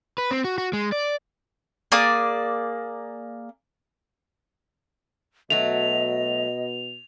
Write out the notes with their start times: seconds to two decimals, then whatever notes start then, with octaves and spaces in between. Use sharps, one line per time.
0.18 B4
0.31 C4
0.44 F#4
0.58 F#4
0.73 G#3
0.92 D5
1.92 A#3 G#4 D5 D#6
5.50 B2 F#3 A3 D#5 F7